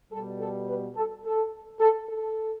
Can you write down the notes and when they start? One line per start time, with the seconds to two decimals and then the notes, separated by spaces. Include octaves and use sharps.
0.12 B2 G3 A4
0.39 A4
0.68 B4
0.96 A4
1.25 A4
1.80 A4
2.09 A4